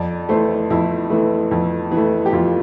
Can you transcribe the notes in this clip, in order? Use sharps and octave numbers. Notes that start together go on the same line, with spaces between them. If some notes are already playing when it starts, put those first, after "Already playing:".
Already playing: F2 D5
E3 A3 C5
F2 E4
E3 A3
F2
E3
A3
G4
F2 F4